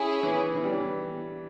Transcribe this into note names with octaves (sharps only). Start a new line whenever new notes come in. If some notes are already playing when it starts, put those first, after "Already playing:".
Already playing: C#4 E4 G#4
E3
E3
G3
E3